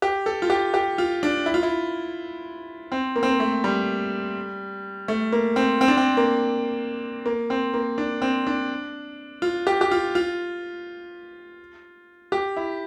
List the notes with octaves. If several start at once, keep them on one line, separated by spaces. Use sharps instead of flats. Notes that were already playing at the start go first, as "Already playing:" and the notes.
G4
A4
F4
G4
G4
F4
D4
E4
F4
E4
C4
A#3
C4
A#3
A3
G3
A3
A#3
C4
C4
D4
C4
A#3
A#3
C4
A#3
D4
C4
D4
F4
G4
G4
F4
F4
G4
E4